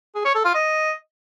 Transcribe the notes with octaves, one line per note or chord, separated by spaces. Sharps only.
G#4
C#5
A4
F4
D#5